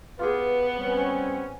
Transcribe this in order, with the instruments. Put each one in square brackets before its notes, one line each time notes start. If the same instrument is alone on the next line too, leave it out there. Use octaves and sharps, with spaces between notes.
[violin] B3 [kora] F4 G4 G#4 [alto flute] B4
[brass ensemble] G3 C4 C#4